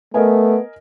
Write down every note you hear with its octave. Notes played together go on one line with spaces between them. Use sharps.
A3 B3 A#4 D#5 G#5